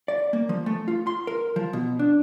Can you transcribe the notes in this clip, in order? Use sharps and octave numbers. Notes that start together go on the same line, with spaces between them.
D5
A#3
F3
A3
F4
C6
A#4
F3
B2
D4